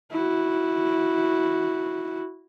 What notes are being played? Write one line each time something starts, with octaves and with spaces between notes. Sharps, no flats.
E4 F#4